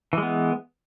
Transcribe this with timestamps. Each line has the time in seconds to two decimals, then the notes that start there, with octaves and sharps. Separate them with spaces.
0.13 E3
0.18 G#3
0.22 B3